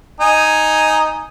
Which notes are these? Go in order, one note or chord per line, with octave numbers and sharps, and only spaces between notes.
D#4 G#5